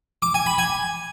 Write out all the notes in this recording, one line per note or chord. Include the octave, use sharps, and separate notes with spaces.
D6
G#5
B5
G#5